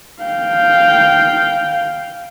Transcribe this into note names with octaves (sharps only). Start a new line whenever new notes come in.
F5 G5